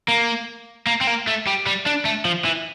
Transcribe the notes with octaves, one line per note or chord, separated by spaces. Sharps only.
A#3
A#3
C4
A#3
A3
G3
G3
D4
A3
F3
E3